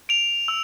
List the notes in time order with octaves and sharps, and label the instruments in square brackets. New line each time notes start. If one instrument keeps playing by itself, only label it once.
[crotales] D7 F7
E6